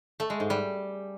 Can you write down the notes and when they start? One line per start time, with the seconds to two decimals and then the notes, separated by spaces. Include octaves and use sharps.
0.20 A3
0.30 G#3
0.40 G#2
0.50 G3